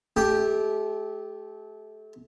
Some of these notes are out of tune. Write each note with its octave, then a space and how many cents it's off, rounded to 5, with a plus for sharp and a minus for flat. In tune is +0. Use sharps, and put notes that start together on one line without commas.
A3 -30 G4 +0 G5 +0